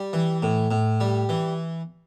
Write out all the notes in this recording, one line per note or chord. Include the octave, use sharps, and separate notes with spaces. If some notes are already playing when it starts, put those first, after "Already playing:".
Already playing: G3
E3
A2
A2
G3
E3